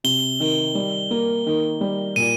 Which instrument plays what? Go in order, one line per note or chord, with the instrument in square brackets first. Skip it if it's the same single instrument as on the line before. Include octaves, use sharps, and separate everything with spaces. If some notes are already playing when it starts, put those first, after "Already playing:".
[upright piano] C3 [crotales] G7
[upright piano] D#3
G3
A#3
D#3
G3
[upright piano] A#2 [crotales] D#7